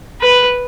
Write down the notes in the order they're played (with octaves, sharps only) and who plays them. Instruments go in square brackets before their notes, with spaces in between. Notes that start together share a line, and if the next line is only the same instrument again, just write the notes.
[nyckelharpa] B4